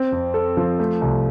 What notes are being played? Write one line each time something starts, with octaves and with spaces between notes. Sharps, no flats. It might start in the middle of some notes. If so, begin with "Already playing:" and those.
Already playing: C4
F2
A4
F3
A3
C2